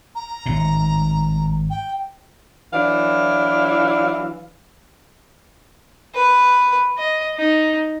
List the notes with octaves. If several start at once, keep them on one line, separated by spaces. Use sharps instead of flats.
A#5
G#1 A2
G5
E3 F#3 D4 E4 F5
B4
D#5
D#4